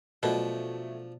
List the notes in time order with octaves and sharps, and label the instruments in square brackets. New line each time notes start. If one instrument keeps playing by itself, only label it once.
[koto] B2 [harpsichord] F3 D4 [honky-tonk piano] F#3 A3